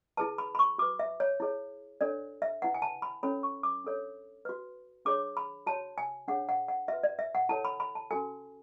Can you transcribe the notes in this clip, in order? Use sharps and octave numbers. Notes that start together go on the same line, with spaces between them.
E4 G#4 B4 A5
B5
B5
C#6
F#4 B4 D6
E5
C#5
E4 G#4 C#5
D4 A4 C#5 D5
E5
E4 B4 F#5
G#5
A5
B5
C#4 E4 A4 C#5 B5
C#6
D6
D4 A4 C#5
F#4 B4
D4 G#4 C#5 D6
B5
F#4 C#5 A5
G#5
D4 G#4 C#5 F#5
F#5
F#5
F#4 B4 E5
D5
E5
F#5
E4 A4 C#5 A5
B5
B5
A5
C#4 F#4 A4 G#5